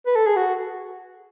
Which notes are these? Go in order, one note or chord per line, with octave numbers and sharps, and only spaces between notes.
B4
A4
G#4
F#4